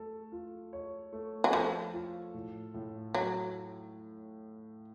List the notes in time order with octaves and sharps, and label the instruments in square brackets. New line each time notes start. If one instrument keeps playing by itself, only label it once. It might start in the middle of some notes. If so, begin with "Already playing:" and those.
Already playing: [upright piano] A3 A4
F4
C#5
A3
[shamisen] F#3
[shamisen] F3 [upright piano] A4
[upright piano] F4
A2
A2
[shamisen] F#3 [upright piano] A3